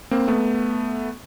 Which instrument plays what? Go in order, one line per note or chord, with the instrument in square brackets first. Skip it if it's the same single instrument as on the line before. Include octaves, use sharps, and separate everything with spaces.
[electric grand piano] A#3 C4
A3 B3